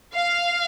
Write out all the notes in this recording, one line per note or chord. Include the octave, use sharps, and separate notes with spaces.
F5